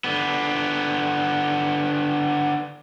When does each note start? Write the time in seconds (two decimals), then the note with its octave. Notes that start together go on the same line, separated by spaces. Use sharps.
0.04 D3 B3